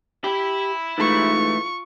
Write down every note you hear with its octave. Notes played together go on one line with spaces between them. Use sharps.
G4 E5 B5
G#2 E3 A3 F4 C#6